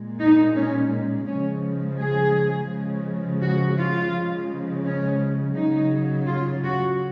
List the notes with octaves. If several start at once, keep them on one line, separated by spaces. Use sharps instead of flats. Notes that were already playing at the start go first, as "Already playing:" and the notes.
Already playing: A#2 G#3
D#4
C#4
C#3 F3 G#3 C#4
G#4
C#3 F3 G#3
F#4
F4
C#3 F3 G#3
C#4
C#3 F#3 D#4
F4
F#4